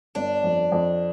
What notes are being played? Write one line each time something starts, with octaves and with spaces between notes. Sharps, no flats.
G1 D4
F2
F2